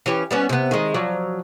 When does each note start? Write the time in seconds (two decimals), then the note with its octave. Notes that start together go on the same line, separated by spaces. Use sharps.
0.06 E3 C#4 G4
0.31 G3 B3 C#4
0.49 C3 B3
0.71 D#3 G#3
0.94 F3 F#3 D5